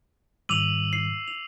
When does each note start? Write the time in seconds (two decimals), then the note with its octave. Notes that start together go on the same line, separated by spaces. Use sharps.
0.49 G#2 D#3 G3 D6 E6 D#7 F7 F#7
0.93 C7
1.28 F7